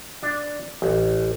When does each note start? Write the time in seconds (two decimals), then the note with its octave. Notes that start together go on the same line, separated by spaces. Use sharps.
0.23 D4
0.82 A1